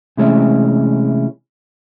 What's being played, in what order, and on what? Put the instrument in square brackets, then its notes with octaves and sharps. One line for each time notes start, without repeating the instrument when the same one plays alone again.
[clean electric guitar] C3 E3 G#3 A3 C#4 E4